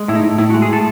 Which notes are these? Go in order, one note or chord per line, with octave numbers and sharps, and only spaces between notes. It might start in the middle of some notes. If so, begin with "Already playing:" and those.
Already playing: G#3
A2 E4
D#4
A2
A2 E4
F#4
G#3
G#4
A2 A4